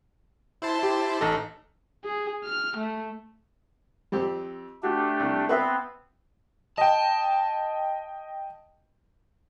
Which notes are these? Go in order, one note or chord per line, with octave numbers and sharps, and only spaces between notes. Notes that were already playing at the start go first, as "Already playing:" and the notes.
E4 C5 A5
G4
A1 D#4 A4 A#5
G#4
F6
A3
F2 C4 G4
A3 D4 F#4 G4
C2
B3 C4 B4 E5
D#5 G5 A5